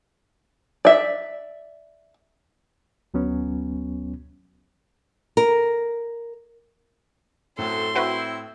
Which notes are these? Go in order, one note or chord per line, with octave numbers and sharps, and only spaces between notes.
D5 E5
D2 F#3 B3 C#4
A#4
F#2 A2 C4 A4 C6
C4 E4 F#4 B4